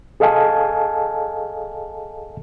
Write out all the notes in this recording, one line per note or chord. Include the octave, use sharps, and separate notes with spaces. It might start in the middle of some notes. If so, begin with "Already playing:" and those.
G#4 A4 D#5 F5 G#5 A5